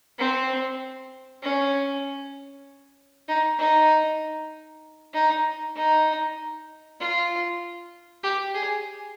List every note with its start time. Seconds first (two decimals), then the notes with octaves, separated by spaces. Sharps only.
0.18 C4
1.42 C#4
3.28 D#4
3.59 D#4
5.13 D#4
5.76 D#4
7.00 F4
8.23 G4
8.54 G#4